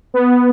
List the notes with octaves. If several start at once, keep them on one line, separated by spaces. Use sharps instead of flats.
B3